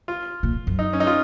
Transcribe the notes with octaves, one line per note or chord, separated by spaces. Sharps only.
F4
A#2
F#2
D#4
C#4
D#4
F4